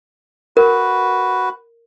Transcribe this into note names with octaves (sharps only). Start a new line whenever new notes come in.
F#4 A#4 B4